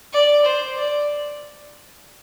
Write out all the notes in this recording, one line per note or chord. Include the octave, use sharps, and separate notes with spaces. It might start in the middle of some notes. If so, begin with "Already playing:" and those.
D5
C5
D5